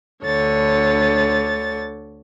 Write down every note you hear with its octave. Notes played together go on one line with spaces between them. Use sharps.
D2 D3 C#5 A6